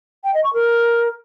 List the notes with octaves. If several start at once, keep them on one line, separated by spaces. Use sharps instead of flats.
G5
D#5
C#6
A#4